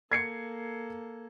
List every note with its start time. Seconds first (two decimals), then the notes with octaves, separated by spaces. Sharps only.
0.11 A#3 A4 G#6 C7 C#7